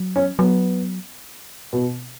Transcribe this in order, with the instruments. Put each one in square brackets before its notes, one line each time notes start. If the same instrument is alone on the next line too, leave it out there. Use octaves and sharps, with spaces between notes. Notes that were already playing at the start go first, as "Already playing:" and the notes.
Already playing: [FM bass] F#3
[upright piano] C#4
[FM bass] F#3 [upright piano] B3
[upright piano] B2